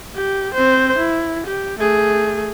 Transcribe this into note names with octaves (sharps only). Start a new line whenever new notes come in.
G4
C4 C5
E4
G4
A3 G#4